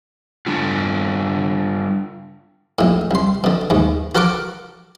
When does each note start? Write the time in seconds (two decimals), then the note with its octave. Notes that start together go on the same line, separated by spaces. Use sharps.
0.47 G3 D4 F4
2.79 A#1 A2
3.11 C2 C6
3.44 B2 D3
3.70 D#2 G#2
4.15 F#4 A4 A#4 F#5 C#6 D6